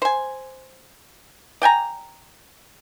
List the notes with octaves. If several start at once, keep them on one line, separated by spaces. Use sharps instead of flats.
C5 G#5
D5 G5 G#5 A#5